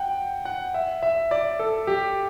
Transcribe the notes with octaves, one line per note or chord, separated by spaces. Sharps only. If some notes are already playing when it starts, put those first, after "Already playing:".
Already playing: F#5 G5
F#5
E5
E5
D5
A4
G4